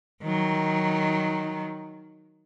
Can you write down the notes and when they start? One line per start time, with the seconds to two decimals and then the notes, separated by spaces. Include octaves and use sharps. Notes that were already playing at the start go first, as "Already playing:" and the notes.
0.23 D#3 F#3